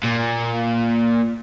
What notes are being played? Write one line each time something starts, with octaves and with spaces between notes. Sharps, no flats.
A#2